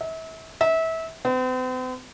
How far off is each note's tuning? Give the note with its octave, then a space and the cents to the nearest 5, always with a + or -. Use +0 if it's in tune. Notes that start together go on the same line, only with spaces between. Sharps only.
E5 -35
E5 -25
C4 -45